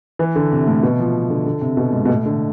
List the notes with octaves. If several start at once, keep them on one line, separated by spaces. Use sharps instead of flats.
E3
D3
C3
A2
B2
F3
D3
D3
C3
B2
G#2
B2
A2
D3